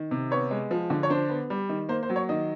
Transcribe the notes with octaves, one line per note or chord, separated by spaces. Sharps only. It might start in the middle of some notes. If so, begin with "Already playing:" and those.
Already playing: D#3
C3
B3 C#5
G#3
F3
D3
C#5
D4 C5
B3
G3
D#3
A#3 C5
C5
F#3
C#5
D#3 D#5